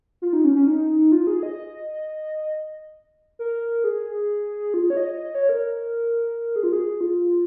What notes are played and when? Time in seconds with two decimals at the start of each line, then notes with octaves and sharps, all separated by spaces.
0.22 F4
0.33 D#4
0.45 C#4
0.56 C#4
0.67 D#4
1.12 F4
1.27 G#4
1.43 D#5
3.39 A#4
3.84 G#4
4.74 F4
4.90 C#5
4.97 D#5
5.19 D#5
5.35 C#5
5.49 A#4
6.56 G#4
6.63 F4
6.73 G#4
7.01 F4